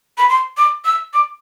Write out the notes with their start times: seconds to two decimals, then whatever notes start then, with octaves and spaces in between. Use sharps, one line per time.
0.18 B5
0.29 C6
0.57 D6
0.85 E6
1.14 D6